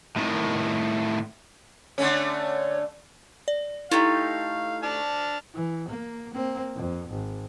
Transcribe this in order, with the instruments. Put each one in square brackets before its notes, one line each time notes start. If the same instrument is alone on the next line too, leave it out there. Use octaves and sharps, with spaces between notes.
[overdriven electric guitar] A2 D#3
[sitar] D3 A3 C#4 [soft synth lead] C#5
[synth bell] D5
[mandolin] A3 D#4 G4 [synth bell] E4 [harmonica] F5
[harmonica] D4 A5 F6
[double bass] E3
A#3
A#3 C4
F2
G#1